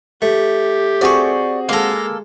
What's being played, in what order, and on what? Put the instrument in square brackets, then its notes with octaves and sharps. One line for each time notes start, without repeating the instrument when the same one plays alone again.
[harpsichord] A3 [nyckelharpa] G4
[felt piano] C4 F#4 G#4 [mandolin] D5 C#6
[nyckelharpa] G#3 [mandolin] A#3 A4 [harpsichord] F5 A#5